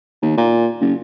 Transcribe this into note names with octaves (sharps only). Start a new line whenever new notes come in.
D#2
A#2
F#1